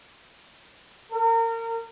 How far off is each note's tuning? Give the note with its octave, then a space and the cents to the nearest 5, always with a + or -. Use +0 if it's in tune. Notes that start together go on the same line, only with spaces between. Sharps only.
A#4 -30